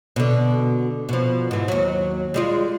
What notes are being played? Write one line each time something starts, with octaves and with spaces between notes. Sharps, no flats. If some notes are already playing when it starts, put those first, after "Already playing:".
B2 D3
B2 F3
G#2 E3
D#2 F#3
G3 G#3 F4